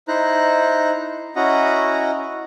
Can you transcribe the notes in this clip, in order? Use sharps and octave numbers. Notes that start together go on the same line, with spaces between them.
D#4 E4 C5 A#5 F#6
C#4 E4 F#4 D#5 F#5 A#5